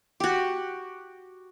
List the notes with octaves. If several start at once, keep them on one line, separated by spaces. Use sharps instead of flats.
F#4 G4